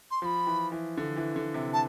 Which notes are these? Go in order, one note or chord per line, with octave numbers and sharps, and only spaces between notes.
C6
F3 B5 C6
E3
E3
D3
E3
D3
C3
A5